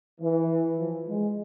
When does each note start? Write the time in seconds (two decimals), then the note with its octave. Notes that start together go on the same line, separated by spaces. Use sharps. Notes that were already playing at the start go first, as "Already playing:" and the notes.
0.21 E3
0.78 F3
1.07 G#3